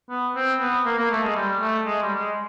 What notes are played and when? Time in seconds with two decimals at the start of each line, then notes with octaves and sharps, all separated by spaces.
0.10 B3
0.35 C4
0.60 B3
0.85 A#3
0.98 A#3
1.11 A3
1.23 G#3
1.36 G3
1.61 A3
1.86 G#3
2.02 G3
2.19 G#3